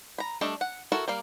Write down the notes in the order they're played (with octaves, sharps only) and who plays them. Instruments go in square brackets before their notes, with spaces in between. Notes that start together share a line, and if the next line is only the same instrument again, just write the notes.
[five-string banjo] A#5 B5
G3 A3 D4 A4 D#5
F#5
E4 F#4 A4 A#4
G3 A#3 F5